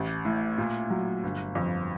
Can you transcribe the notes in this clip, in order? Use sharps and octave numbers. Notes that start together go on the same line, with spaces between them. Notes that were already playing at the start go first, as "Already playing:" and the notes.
Already playing: A1
A2
A#2
F#3
G1
F2